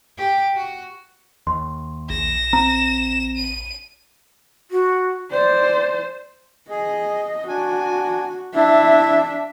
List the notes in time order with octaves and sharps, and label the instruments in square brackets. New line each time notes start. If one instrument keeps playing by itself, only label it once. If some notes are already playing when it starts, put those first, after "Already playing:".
[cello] G4
F#4
[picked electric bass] D#2 [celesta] C6
[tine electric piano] A#1 [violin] A#6 E7
[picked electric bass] C4 [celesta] A#5
[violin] D#7
[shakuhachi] F#4
[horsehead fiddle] C5 [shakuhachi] D5
[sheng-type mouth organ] G#4 [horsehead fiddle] D#5
[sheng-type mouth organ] D4 G#5 [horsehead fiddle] F#4
[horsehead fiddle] D4 E5 [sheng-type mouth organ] E4